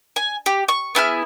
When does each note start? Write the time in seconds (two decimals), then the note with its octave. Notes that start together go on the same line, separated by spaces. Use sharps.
0.16 G#5
0.46 G4
0.68 C#6
0.95 B3 E4 G#4 F6